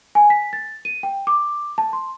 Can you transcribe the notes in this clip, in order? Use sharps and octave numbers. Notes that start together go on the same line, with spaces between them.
G#5
B6
A6
D#7
G5
D6
A5
C6